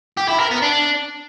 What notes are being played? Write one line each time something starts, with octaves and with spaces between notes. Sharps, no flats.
G4
E4
A#4
B3
D4